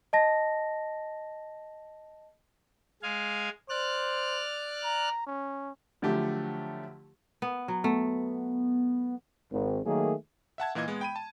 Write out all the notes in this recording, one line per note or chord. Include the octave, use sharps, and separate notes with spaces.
D#5 A5 A#6
G#3 F5 G#5
C5 D5 F6 F#6
A#5
C#4
D3 F3 F#3 A3 G4
B3
F#3
A3 B3
G#1
D#3 F#3 A3 A#3 G#4
E5 F#5 A5 G#6
A#2 E3 A#3 D#5 G#6
G#3 B3
G5 B5 D#7
A5